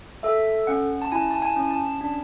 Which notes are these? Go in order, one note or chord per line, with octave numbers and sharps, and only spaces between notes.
A4 E5
C#4 F#5
A5
E4 G#5
A5
G#5
C#4
A5
D4